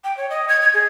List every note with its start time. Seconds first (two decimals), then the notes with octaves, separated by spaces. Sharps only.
0.04 G5
0.17 C#5
0.30 D#5
0.48 G#6
0.61 G#6
0.73 G#4